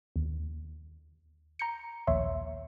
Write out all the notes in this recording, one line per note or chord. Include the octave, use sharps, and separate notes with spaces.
D#2
A#5 G6 C#7
A#1 D#2 C#5 E5 C6